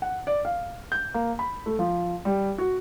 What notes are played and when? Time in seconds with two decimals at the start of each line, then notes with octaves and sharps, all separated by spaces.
0.02 F#5
0.27 D5
0.45 F5
0.92 G6
1.14 A#3
1.39 B5
1.66 A3
1.79 F3
2.25 G3
2.58 F#4